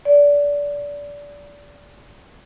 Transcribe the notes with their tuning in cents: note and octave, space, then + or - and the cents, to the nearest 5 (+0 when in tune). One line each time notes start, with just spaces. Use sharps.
D5 -25